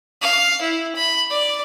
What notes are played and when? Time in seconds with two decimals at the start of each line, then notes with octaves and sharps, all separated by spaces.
0.22 F5
0.61 E4
0.95 B5
1.31 D5